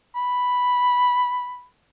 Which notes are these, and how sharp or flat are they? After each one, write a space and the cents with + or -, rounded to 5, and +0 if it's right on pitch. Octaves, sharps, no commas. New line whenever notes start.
B5 +0